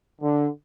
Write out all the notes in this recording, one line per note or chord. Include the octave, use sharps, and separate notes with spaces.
D3